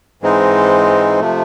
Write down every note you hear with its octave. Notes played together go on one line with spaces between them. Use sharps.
G#2 E3 G#3 C4 D#4
C3 F3 A3